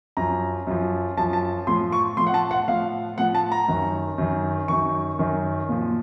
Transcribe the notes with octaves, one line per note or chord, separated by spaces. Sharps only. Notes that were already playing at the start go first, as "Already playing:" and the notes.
F#2 F3 A#5
F#2 F3
F#2 F3 A5
A5
A2 F3 C6
C#6
A2 F3 C6
F#5
A5
F#5
A2 F3 F5
A2 F3 F#5
A5
A#5
F#2 D#3
F#2 D#3
F#2 D#3 C#6
F#2 D#3
A#2 F3